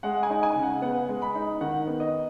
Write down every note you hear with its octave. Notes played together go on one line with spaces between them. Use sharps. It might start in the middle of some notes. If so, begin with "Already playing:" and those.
G#3 F#5
G#5
D#4
G#5
C#3
F#5
B3 F#5
G#3
B5
D#4
D#3 F#5
B3
D#5